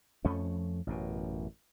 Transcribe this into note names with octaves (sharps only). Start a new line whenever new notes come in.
F2 F3 A3 C#4
A1 F#2 B2